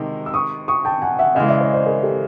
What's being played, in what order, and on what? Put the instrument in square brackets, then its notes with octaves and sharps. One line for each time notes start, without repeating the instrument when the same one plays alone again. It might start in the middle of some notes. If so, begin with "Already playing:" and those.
Already playing: [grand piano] C3 D#3 G#3 [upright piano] D6 E6
[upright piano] E6
C#6 D#6
C#6 D#6
G5 A5
F#5 G#5
E5 F#5
[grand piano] C#3 E3 G#3 [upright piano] D#5 F5
[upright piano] D5 E5
C#5 D#5
C5 D5
G#4 A#4
G4 A4